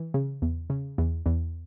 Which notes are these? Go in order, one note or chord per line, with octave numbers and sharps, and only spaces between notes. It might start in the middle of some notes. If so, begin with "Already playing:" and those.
Already playing: E3
C#3
E2
C#3
E2
E2